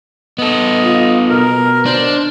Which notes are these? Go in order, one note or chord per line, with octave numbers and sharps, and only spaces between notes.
B3 A4 D#5
F4
B2 A#4
D4 C5